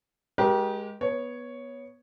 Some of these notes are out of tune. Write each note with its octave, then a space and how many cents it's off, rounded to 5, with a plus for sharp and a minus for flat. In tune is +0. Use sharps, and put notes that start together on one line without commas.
G#3 +0 G4 -15 A#4 +40
B3 -10 C#5 +0